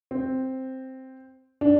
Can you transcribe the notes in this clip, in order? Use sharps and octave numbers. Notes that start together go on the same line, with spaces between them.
C4
D4